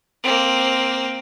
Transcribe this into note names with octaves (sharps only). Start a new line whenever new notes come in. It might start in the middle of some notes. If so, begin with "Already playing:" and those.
A#3 C4